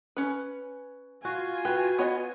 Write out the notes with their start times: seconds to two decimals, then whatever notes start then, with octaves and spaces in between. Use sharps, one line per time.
0.17 C#4 B4
1.25 F4 F#4 G#5
1.65 F#4 G4 B4
1.99 B3 C#5 D#5